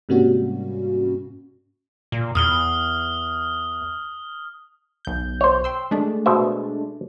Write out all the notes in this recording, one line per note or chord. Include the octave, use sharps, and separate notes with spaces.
G#2 C3 G3 A#3 C#4 F#4
A#2
E2 D#6 F6 G7
B1 G6
C5 C#5
G5 C6 E6
G#3 A3 D4
B2 C5 E5